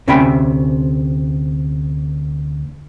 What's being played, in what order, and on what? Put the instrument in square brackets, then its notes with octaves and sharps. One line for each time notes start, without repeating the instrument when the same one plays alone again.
[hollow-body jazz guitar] D2 C3 C#4 E5 G5 B5